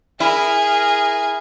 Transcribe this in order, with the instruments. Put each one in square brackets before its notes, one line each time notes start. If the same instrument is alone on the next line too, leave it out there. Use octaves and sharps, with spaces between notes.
[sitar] E4 [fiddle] G#4 [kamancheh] A#4 F6